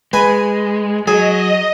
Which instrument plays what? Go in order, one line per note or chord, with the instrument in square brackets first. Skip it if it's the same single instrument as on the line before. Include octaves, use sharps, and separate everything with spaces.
[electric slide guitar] G#3 [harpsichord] B4 G#5
[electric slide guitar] F#3 [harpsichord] G#4 [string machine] D#5